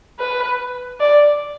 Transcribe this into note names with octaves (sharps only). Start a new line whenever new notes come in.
B4
D5